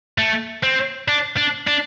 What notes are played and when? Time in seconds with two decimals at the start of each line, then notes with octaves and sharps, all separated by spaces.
0.18 A3
0.63 C4
1.08 D4
1.37 D4
1.67 D4